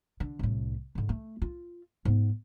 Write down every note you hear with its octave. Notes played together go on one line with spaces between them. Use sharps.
D3
C2 A2
G#2 D3
A3
F4
G#2 B3